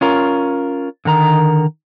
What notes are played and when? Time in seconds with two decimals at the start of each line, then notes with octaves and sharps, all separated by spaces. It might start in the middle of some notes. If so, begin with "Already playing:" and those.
0.01 C#4 F4 A#4
1.05 D3 D#3 A#4 A#5